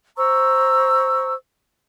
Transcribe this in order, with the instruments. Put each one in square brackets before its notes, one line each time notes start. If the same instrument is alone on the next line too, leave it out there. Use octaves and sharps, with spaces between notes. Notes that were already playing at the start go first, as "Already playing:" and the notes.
[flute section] C5 A#5 C#6 E6